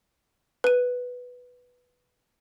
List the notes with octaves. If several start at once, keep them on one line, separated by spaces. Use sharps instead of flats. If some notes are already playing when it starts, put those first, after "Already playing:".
B4 D#7